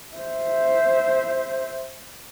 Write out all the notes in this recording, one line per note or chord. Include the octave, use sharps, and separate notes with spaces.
C5 E5